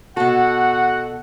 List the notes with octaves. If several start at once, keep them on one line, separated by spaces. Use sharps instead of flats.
B2 F#4 A4 F#5